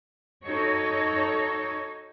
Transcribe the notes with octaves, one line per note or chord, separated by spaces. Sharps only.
D#4 F#4 A4 C#5